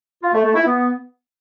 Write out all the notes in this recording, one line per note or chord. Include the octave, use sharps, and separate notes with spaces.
F4
A3
A3
E4
B3